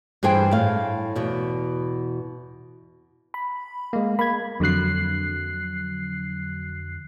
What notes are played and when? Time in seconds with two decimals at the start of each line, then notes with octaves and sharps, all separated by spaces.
0.23 G2 E3 G#4 C5 G5
0.51 A2 F5
1.16 E2 B2
3.34 B5
3.93 G#3 A#3
4.19 A#3 B5 G#6
4.60 F2 D3 F#3 F#6 C7